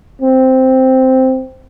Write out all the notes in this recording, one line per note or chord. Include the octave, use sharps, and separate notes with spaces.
C4